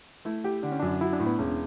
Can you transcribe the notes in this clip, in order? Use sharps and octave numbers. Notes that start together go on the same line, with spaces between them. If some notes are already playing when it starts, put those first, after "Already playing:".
A3 E4
G4
D3 D4
C#4
F#2 D4
F#3 E4
D4
A2
B3
E1 C#4